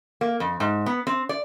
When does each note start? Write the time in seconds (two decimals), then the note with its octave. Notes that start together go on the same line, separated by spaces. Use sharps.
0.21 A#3
0.40 F2
0.60 G#2
0.86 B3
1.07 C4
1.29 D5